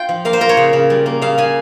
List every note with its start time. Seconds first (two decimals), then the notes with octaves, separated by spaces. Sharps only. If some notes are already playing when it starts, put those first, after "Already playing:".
Already playing: F4 G5
0.09 F3
0.25 A#3 F5
0.33 C5
0.41 F4 A#4
0.49 C#5
0.57 C#3
0.73 C#3
0.90 G3
1.06 A#3
1.22 C#3 F5
1.38 C#3 G#5